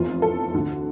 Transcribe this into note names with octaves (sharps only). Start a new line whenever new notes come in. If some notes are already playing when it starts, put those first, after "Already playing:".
Already playing: F1 E2 E3 F4
A4
D2 D3